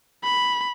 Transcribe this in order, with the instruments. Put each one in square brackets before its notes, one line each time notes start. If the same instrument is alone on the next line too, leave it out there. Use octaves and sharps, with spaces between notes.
[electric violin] B5